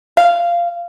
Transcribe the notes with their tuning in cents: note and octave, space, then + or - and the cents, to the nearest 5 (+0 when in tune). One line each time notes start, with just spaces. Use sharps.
F5 -15